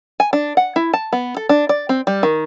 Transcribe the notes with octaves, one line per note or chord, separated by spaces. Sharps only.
G#5
D4
F#5
E4
A5
B3
A4
D4
D5
C4
G3
D#3